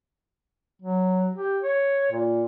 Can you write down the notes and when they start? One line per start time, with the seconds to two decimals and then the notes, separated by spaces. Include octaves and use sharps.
0.81 F#3
1.35 G4
1.62 C#5
2.12 A#2